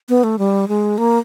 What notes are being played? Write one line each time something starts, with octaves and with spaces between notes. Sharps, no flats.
B3
A3
G3
G#3
A#3